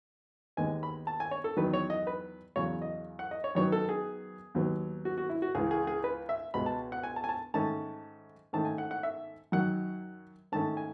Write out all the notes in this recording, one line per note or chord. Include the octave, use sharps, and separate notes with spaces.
D#2 D#3 G#3 B3 G#5
B5
A5
G#5
C#5
A4
E2 D#3 F#3 B4
C#5
D#5
B4
E2 C#3 F#3 C#5
D#5
F#5
D#5
C#5
F#2 D#3 F#3 B3 C#5
A4
G#4
D#2 D#3 F#3 B3
F#4
F#4
E4
F#4
C#2 C#3 E3 G#4
G#4
G#4
B4
E5
C#2 B2 G#3 B3 B5
A5
F#5
G#5
A5
G#5
A5
G#2 D#3 A3 C#4 A5
G#2 D#3 A3 C#4 A5
G#5
F#5
F#5
E5
F#2 D#3 F#3 F#5
G#2 D#3 A3 C#4 A5
G#5